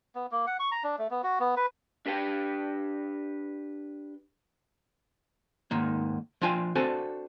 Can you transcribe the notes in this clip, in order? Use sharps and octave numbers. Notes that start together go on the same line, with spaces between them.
B3
A#3
F#5
C#6
A#5
D4
A3
B3
F#4
B3
B4
D4 G4 B4 G5
D2 G#2 D#3 A#3
F3 D4 F4 G5 G#5
C4 D4 F#4 A4 C5 G#5